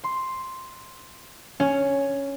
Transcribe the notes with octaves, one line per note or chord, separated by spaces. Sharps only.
C6
C#4